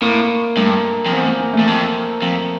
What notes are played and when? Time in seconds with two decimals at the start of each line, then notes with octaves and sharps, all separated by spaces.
0.02 A2 A#3
0.57 G2 A3
1.06 F2
1.12 E2 C4
1.26 A#3
1.40 A#3
1.53 A3
1.59 E2
1.68 F2
2.22 F2